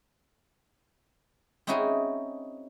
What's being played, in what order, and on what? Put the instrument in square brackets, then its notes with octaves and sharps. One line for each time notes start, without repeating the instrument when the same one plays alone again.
[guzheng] C4 C#4 D#4 E4 F#4 G#4